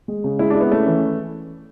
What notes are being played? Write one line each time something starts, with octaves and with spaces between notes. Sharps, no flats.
G#3
C#3
G#3 E4
D4
E4
B3
A3 C#4
E3